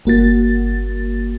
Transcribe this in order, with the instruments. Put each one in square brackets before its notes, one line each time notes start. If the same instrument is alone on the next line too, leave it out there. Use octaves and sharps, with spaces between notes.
[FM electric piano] G1 A#3 F#4 A6